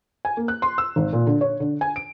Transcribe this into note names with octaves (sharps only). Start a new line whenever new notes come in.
G#5
A#3
F#6
C6
E6
G#1
A#2
D3
C#5
D3
G#5
D7